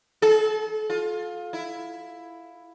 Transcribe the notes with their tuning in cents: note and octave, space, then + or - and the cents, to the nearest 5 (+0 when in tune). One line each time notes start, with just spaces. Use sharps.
A4 -35
F4 +20
E4 +10